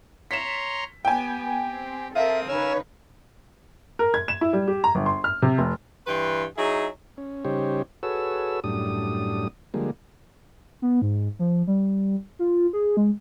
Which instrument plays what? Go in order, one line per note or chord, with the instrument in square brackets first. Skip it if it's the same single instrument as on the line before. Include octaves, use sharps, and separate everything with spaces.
[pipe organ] C#5 A#5 C6 [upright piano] B6 E7
[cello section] B3 [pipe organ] G4 [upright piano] G5 G#5
[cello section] C4
[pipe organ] C4 D#6 [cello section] A4 A#4 [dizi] E5 [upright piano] F5
[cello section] C#3 D#4 B4 [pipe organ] A#4 G#5 E6 [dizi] C#5
[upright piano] A#4
G#6
E7
E4
G3
G4
A#5
G1
C6
F6
C3
F1
[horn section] G2 E3 B4 G5 C6
F#3 D#4 E4 G#4
[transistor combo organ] C#4
C#3 G3 D#4 G4 C5 C#5
F#4 G#4 A4 B4 C#5 E6
F#2 A2 G3 D4 D#6
D3 F3 G3 G#3 A#3
[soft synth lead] B3
G#2
F3
G3
F4
G#4
G#3